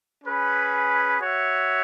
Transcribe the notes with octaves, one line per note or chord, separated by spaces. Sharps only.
C#4 G#4 B4
F#4 C#5 E5